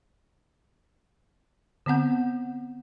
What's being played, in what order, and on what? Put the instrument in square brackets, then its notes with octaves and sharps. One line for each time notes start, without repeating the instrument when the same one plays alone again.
[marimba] D3 B3 C4 F#5 G6